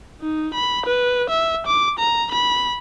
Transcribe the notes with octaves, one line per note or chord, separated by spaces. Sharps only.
D#4
B5
B4
E5
D6
A#5
B5